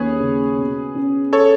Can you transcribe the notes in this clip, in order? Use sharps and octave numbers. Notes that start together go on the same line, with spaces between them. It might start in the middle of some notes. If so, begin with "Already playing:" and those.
Already playing: D#2 C#4 G#4 B4 C#5
C#3
B2
C#4
A4 C#5